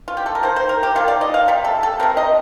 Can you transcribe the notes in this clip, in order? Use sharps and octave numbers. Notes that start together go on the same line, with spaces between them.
F4
G4
A4
A#4
D#3 A#3 C5
C5
A#4
G4
D#3 A#3 F4
D5
D#5
F5
C3 G3
A4
A4
C3 G3 C4 A#4
D#5